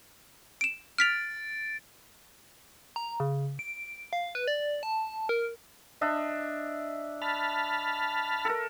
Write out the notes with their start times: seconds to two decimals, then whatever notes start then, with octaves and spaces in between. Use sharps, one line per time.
0.61 D7 E7
0.98 F6 A6 B6 D7 F7
2.96 A#5
3.20 C#3
3.59 D7
4.13 F5
4.35 B4
4.47 D5
4.83 A5
5.29 A#4
6.01 D4 D#5 E5
7.22 A5 B5 F6
8.45 A4 A#4